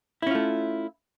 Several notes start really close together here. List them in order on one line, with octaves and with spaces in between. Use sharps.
E4 C#4 F4 A3